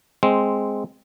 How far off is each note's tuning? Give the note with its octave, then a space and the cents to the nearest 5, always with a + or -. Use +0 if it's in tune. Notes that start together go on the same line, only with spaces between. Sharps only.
G#3 +0 C4 +0